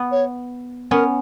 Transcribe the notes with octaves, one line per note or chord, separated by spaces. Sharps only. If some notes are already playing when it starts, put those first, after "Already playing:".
Already playing: B3
C#5
B3 C#4 A#4